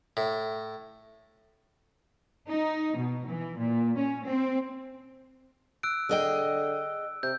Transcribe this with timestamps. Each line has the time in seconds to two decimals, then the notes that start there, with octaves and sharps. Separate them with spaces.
0.17 A2
2.48 D#4
2.98 B2
3.27 E3
3.57 A#2
3.97 C#4
4.27 C4
5.83 E6 F#6 D7
6.09 D3 G#4 D#5 G5
7.23 C3 G6